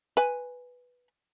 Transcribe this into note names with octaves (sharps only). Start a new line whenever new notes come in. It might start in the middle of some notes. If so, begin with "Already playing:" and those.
B4 G#5